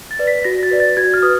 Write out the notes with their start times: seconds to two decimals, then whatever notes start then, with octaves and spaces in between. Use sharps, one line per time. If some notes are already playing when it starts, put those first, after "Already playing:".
0.11 A6
0.19 B4 D5
0.27 B6
0.44 F#4 A#6
0.63 A6
0.71 B4 D5
0.80 A6
0.97 F#4 G#6
1.14 F6
1.22 B4 D#6